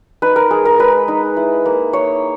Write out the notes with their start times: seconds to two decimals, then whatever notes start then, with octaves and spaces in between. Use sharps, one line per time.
0.22 D#4 B4
0.36 A#4
0.51 G#3 G#4
0.65 A#4
0.79 G#3 B4
1.08 D#4
1.37 E4
1.66 A#3
1.93 A#3 C#5